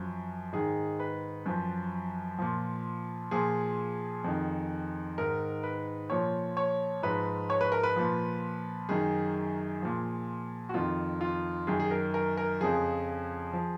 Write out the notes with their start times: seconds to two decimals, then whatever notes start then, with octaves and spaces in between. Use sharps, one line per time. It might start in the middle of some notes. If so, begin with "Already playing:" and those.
Already playing: F#2 F3
0.52 G#2 D#3 G#4
1.00 B4
1.46 F#2 F3
2.39 A#2 F3
3.31 A#2 F3 G#4
4.24 F2 D#3
5.18 G#2 D#3 A#4
5.63 B4
6.10 A#2 F3 C#5
6.57 C#5
7.02 G#2 F3 B4
7.50 C#5
7.61 B4
7.72 A#4
7.83 B4
7.96 A#2 F3
8.89 F#2 D#3 G#4
9.82 A#2 F3
10.69 F#4
10.74 F2 D#3 F4
11.21 F4
11.67 F#2 D#3 G#4
11.80 G#4
11.91 A#4
12.14 A#4
12.37 A#4
12.61 F2 C#3 F3 G#4
13.53 F3